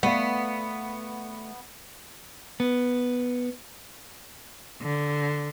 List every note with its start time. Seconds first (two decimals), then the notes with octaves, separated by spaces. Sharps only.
0.03 A3 B3 D5 F5
2.60 B3
4.81 D3